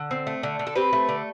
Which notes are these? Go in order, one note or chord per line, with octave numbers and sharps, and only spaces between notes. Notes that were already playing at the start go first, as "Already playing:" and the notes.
Already playing: D3
C4
A3
D3
D3
A4
C4 G4 B4
A3
D3